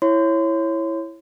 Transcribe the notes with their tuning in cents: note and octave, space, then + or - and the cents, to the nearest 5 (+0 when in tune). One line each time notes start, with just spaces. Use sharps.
E4 +5 C#5 -15 C6 -35